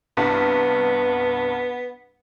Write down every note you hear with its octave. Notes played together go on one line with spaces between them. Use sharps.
C2 G2 B3